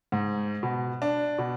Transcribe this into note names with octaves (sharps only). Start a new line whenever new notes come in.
G#2
B2
D4
B2